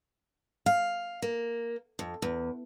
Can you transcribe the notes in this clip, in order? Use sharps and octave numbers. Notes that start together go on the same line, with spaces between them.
F5
A#3
F2
E2